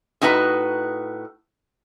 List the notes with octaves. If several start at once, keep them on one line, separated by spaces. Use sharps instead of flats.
A2 D#4 F#4 B4 A#5